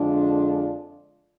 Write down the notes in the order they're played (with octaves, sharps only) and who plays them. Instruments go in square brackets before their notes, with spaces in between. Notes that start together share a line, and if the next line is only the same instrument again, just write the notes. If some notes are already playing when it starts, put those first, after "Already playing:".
Already playing: [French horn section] F2 D3 G#3 D4 F4